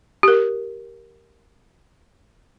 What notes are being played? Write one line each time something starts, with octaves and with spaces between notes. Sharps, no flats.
G4 A#4